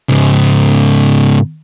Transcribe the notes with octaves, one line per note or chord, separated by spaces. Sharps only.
G#2 C#3